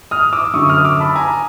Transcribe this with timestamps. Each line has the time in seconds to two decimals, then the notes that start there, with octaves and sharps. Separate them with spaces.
0.11 D#6 F6
0.33 D6 E6
0.53 F#2 D3 C#6 D#6
0.69 D#6 F6
0.85 D6 E6
1.00 A5 B5
1.16 G#5 A#5